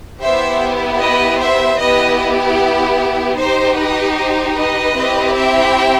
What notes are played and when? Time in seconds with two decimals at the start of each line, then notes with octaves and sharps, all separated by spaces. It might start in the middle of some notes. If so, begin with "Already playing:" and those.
0.21 B3 E4 G4 C5 E5
0.99 B4 D#5
1.39 C5 E5
1.79 B3 E4 G4 B4 D#5
3.37 D#4 G4 C5
3.77 B4 D#5
4.17 C5
4.56 B4 D#5
4.95 C4 E4 G4
5.35 E5 G5